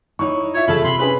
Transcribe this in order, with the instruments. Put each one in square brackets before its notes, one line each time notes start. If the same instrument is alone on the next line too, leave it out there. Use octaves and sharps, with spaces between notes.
[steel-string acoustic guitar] D#4 E4 [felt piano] C#5 C#6
[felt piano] F4 E5 [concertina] C#5
[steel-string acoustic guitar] C#3 A4 A5 [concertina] B5
[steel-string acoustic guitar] C3 [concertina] B5 C6
[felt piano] C#4 G#4 B4 [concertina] B5